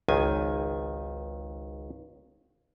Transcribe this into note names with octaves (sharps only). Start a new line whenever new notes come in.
G#1 C#2 D#3 G#5